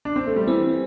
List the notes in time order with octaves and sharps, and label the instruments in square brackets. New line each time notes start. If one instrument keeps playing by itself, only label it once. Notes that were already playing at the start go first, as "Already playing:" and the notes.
[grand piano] D4
C4
A3
G3
[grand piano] E3 [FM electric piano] C4